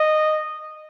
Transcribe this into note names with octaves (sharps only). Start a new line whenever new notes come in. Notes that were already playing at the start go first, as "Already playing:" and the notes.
Already playing: D#5